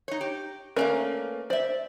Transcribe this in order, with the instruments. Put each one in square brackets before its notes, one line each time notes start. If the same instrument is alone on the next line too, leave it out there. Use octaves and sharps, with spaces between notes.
[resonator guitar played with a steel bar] D#4 C#5
G4
[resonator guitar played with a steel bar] A3 A#3 C#4 [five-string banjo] A#4 B4 D5
[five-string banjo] C5 [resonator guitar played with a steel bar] D5 E5